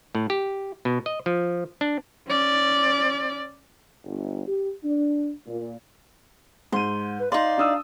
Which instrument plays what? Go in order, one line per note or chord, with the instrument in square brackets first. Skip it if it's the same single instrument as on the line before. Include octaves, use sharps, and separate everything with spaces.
[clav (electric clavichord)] A2
G4
B2
D#5
F3
D4
[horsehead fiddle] C#4 D5
[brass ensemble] G1
G4
D4
A#2
[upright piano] G#2 D#7 [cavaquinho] C6
[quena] B4
[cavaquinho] D#4 D5 [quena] F5 [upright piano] C6
[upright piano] D4 D#6 E6